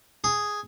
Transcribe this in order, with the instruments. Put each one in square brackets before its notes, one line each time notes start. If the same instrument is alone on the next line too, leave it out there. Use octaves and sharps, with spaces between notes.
[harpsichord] G#4